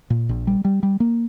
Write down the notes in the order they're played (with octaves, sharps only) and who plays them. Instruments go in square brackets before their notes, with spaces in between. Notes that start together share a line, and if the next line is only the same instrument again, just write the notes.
[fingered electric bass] A#2
A#1
G3
G3
G3
A#3